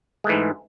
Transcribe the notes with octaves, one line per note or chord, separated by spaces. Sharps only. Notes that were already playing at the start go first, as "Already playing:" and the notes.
G#2 E3 G#3 A3